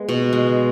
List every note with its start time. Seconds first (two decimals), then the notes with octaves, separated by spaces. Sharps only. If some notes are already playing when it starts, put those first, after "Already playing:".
Already playing: G#3 B3
0.09 B2
0.33 G#3